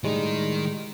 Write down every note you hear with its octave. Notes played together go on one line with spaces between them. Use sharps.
A2 D#3 G3 G#3 D#4